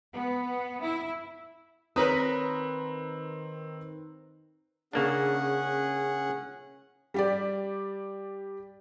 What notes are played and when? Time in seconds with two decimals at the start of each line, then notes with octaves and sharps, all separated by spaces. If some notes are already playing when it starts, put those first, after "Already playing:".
0.13 B3
0.82 E4
1.96 D#3 C4 A#4 B4 C#5 A#5 D#6
4.93 C#3 A#3 C#4 D4 G#4 F#5
7.14 G3 G4 D5